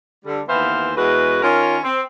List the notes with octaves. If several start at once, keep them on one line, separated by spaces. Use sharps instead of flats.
D3 G3
D#2 E3 B3 E4 C5 F5
E2 G#3 F#4 B4
D#3 C#4 F4 A#4 C#5
C4